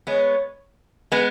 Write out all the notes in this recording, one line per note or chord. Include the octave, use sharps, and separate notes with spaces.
G#3 B3 C#5
G#3 B3 B4